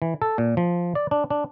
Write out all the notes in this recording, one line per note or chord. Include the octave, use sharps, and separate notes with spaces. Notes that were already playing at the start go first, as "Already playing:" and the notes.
E3
A4
A#2
F3
D5
D4
D4